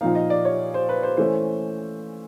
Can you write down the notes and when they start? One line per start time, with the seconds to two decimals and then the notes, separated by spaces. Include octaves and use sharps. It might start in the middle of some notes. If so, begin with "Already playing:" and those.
0.01 A#2 F3 A#3 D#4 F5
0.15 D#5
0.30 D5
0.45 C#5
0.74 C5
0.89 B4
1.03 C5
1.17 E3 A3 C#4 C5